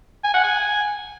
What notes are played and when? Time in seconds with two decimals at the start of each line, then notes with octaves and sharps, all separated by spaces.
0.24 G#5
0.34 F#5
0.44 G#5